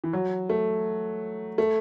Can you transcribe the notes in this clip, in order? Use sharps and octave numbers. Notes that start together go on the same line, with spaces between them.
E3
F#3
A3
A3